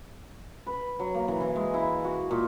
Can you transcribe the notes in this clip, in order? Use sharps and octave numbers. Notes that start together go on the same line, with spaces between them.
B4
F#3
A#3
E3
E3
G#3
E4
F#4
A#2